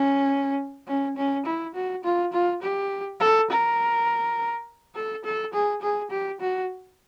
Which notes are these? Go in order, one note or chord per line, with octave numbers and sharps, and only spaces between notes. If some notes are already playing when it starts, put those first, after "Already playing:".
Already playing: C#4
C#4
C#4
E4
F#4
F4
F4
G4
A4
A#4
A4
A4
G#4
G#4
G4
F#4